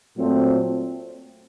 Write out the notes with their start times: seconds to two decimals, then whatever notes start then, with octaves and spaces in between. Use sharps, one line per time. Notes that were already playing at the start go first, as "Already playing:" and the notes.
0.16 A#2 F#3 A3 C4